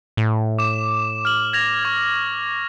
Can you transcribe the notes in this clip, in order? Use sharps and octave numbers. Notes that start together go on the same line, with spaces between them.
A2
D6 E7
F6 F#7
G#6 A#6 F7
C#6 G#6